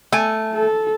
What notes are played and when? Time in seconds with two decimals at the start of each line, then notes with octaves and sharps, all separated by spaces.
0.12 A3 G#5
0.53 A4